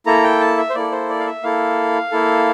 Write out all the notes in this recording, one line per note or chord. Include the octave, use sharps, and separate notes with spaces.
A#3 E4 A4 A#5
G5
A5
E5
C5
A#3 E4 A4 D5
C5
D5
F5
E5
A#3 E4 A4 F5
A#3 E4 A4